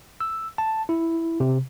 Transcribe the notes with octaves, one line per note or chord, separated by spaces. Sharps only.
E6
A5
E4
C3